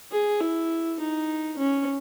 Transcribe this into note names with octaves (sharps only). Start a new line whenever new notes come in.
G#4
E4
D#4
C#4